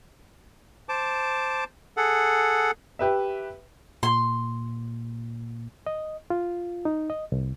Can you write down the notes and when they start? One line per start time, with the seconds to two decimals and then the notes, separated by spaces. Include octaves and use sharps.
0.89 C5 A5 D6
1.97 G#4 A4 F#5
2.99 G4 B4 E5
4.03 A#2 C6
5.87 D#5
6.30 F4
6.85 D#4
7.10 D#5
7.32 C2